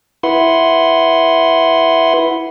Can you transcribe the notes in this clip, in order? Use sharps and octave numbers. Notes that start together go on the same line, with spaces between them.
E4 B4 F#5 C6